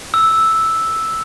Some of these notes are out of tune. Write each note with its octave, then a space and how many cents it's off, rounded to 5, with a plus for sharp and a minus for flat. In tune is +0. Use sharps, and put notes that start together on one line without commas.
E6 -5